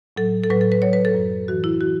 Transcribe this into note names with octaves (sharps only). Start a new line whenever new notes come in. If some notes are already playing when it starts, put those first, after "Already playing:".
A2 F#3 A4
A4
A2 F#3 B4
A4
B4
A2 F#3 C#5
B4
A4
F#2 F#3
A2 E3 F#4
E4
E3 F#4